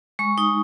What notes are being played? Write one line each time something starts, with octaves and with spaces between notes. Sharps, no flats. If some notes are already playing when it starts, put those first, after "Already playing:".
G#3 C#6
D#4 D#6